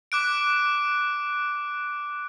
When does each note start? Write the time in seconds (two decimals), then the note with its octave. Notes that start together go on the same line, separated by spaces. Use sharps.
0.12 D6 F#6 D7